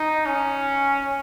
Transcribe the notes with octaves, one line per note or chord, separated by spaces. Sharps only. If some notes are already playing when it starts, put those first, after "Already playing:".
Already playing: D#4
C#4